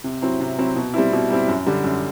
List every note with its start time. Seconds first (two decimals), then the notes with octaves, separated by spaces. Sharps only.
0.04 C3
0.22 F#3 C4 E4
0.40 C3
0.59 F#3 C4 E4
0.76 B2
0.94 G3 C4 E4
1.13 B2
1.30 G3 C4 E4
1.48 F#2
1.67 D3 G3
1.84 F#2